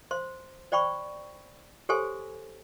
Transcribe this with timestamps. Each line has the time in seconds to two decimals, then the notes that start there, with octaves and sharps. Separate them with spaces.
0.11 C5 C6
0.72 C5 D5 G5 B5 C#6
1.89 G4 A4 C5 C#5 G#5 C6